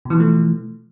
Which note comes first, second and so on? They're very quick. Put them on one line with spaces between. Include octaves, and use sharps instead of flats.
B2 E3 F3 A3